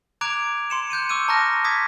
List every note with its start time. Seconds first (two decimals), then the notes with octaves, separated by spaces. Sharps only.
0.21 A#5 D6 F#6 G#6 D7 F7
0.70 C6 C#7 E7
0.90 F#6 G6 C#7 D#7
1.09 C#6 D6 E6 F#6 D#7
1.28 A5 A#5 C#6 F6 F#6 A#6
1.64 D6 D#6 G#6 B6